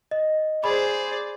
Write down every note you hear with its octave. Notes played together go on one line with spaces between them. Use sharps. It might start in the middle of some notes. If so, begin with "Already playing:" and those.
D#5
G#4 C5 D5 B5